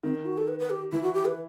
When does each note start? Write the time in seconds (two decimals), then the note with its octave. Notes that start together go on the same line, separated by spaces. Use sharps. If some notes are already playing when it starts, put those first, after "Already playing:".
0.03 D#3 C4
0.15 D#4
0.26 F#4
0.38 A4
0.48 B4
0.59 B4
0.70 G4
0.92 E3 E4
1.03 F#4
1.14 G4
1.25 B4